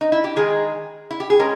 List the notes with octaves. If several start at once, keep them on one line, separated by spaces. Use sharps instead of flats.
D#4
E4
G4
D#3 G#3 D#4 G#4
E4
G4
G#4
G#3 C#4 A#4